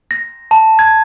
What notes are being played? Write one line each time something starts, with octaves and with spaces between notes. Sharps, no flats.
A#6
A5
G#6